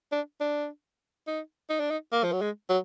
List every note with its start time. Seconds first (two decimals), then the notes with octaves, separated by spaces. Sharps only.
0.12 D4
0.41 D4
1.27 D#4
1.69 D#4
1.80 D4
1.90 D#4
2.13 A#3
2.24 F3
2.32 F#3
2.41 G#3
2.69 F#3